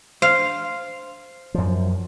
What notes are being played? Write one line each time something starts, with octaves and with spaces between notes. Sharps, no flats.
C5 F5
F#2 F3